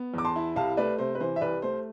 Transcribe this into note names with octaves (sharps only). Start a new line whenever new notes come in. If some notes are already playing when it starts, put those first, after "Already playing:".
Already playing: B3
E2 D6
A5 C6
E4
C2 F5 A5
A3 B4 D5
C3 C5
B4
E3 C5
E5
C2 B4 D5
A3 C5